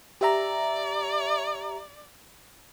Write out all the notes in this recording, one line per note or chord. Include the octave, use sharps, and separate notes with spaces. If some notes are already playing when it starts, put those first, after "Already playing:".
G4 D5 E5 A#5